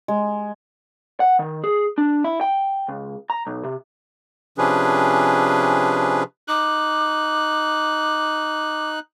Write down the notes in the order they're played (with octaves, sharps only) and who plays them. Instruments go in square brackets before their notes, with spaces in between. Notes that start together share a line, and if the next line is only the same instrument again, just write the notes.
[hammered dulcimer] G#3
[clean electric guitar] F#5
D#3
G#4
D4
E4
G5
C#2
A#5
B1
C3
[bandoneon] C3 F3 C#4 D4 G#4 B4
[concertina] D#4 F#6 [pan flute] D6